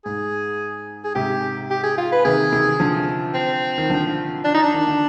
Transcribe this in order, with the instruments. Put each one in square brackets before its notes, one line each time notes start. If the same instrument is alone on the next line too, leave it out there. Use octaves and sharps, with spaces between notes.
[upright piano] G#2 [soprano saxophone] G#4
[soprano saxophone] G#4
[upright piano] G#2 C3 [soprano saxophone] G4
[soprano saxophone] G4
G#4
F4
B4
[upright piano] C3 D#3 [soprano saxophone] G#4
[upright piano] C3 D#3
D3 F3
[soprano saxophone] C4
[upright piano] D#3
D3 F3
[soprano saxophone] D4
D#4
D4
[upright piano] D#3
D3